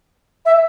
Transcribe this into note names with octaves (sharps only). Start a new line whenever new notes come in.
E5